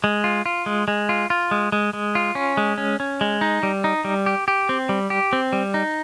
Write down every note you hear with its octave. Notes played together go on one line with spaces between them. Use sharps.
G#3
F4
F4
G#3
G#3
F4
F4
G#3
G#3
G#3
F4
C#4
G#3
C#4
C#4
G#3
D#4
G3
D#4
G3
G4
G4
C4
G3
G4
C4
G3
D#4